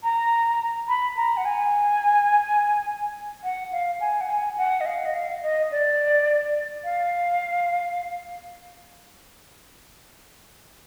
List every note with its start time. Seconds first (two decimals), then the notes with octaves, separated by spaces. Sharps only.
0.03 A#5
0.88 B5
1.17 A#5
1.37 F#5
1.45 G#5
3.44 F#5
3.72 F5
4.01 G#5
4.21 F#5
4.29 G#5
4.58 F#5
4.81 D#5
4.86 F5
5.05 D#5
5.14 F5
5.42 D#5
5.71 D5
6.84 F5